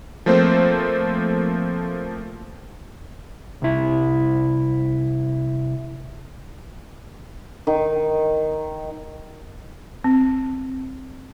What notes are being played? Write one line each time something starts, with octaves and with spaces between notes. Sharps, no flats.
F3 A3 A#3 C4 C5
C2 E4
D#3
C4